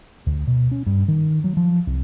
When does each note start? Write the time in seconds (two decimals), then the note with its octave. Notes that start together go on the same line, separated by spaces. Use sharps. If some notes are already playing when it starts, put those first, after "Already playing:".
0.26 D2
0.47 B2
0.71 C#4
0.86 G2
1.08 D#3
1.44 F#3
1.57 F3
1.87 C2